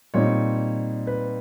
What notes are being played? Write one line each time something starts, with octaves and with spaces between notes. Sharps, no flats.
A#2 G3 C4 D#4 C#5
B4